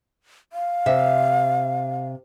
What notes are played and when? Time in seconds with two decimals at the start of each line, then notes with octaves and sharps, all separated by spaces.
0.53 F5
0.86 C3 E5